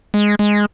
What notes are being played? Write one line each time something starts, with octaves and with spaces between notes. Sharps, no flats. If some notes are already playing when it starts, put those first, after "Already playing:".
G#3
G#3